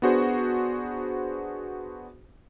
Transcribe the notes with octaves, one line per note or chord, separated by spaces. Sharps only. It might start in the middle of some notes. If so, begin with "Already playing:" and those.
B3 D4 F#4 G#4 C5